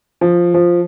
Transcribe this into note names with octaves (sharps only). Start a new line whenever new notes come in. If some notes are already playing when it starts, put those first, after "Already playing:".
F3
F3